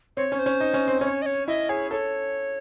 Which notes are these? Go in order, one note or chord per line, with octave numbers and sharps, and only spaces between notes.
C4 C#5
C#4
C5
C#4
D#4
C#4
C4
C#4 C#5
D#5
C#5
E4 D#5
G#4 C#5
A4 C#5